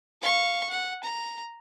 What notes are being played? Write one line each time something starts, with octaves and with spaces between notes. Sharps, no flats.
F5 C#6
F#5
A#5